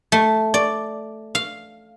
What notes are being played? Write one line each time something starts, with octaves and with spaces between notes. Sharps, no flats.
A3
D5
F5